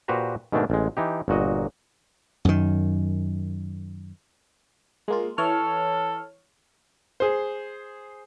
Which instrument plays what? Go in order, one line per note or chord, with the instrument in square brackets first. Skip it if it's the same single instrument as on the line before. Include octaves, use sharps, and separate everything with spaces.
[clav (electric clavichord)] A#2 F#4 G4 B4 C5 A#5
G#2 B2 D#3 A3 A#3 D4
A1 G#3
E3 D#4 G4
G1 A#2 F#4 D#5
[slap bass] F#2 D#3
[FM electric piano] G#3 A#3 F4
[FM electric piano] E3 C#5 F6 [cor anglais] A4
[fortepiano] G#4 C5